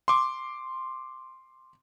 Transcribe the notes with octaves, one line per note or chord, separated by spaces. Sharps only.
C6 D6